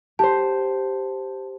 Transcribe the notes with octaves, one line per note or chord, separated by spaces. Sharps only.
G4 C5 A5